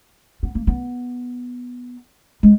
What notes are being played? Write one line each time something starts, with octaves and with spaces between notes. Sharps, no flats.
B3
A#3
B3
G#3